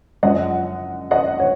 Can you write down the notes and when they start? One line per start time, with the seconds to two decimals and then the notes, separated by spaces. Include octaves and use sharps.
0.23 F#2 F3 G#3 D#5 F#5
1.11 D#5 F#5
1.40 C#5